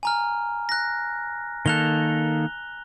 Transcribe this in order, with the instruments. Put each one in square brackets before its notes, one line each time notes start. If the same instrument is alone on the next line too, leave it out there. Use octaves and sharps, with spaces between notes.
[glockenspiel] G#5 A#5 F6
F#6 A#6
[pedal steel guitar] D#3 A#3 A4 [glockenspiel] F#6 F7 G7